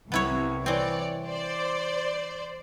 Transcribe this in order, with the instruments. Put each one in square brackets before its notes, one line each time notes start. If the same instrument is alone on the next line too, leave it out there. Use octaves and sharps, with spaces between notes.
[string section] C2 [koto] B3 E4 C#5
[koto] E3 C4 [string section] C#5 D5
[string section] C5 D5